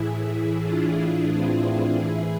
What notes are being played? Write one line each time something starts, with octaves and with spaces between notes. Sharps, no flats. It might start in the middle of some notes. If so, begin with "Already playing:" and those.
Already playing: A2 E3 E4 G#4
D4 F4
C4 E4
D4 F4
A2 E3 E4 G#4